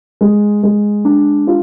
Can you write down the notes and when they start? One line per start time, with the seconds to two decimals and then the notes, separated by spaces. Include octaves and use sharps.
0.21 G#3
0.63 G#3
1.05 D4
1.47 F4